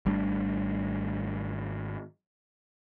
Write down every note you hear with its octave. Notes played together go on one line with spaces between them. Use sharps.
G#1 G3 A3 D4